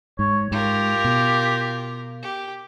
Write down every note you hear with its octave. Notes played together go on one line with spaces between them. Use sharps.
G#2 C#5
G#2 F4 G4 A#4
B2
G4